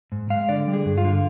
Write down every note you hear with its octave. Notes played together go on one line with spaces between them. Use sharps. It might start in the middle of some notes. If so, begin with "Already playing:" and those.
G#2
G#3 F5
D3 D5
G3
G#4
G2
F4
D3